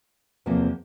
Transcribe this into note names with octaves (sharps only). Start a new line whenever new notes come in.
E2 C3 F3 A#3